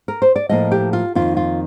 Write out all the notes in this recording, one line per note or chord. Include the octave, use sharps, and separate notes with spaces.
A#4
C5
D5
A2 F3 A#3 D#5
G4
F4
F2 D#3 A#3 F4
F4